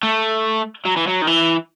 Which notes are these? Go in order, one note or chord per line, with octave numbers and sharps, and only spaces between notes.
A3
F#3
E3
F#3
D#3
E3